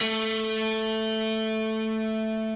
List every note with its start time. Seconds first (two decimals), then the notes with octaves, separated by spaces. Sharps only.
0.01 A3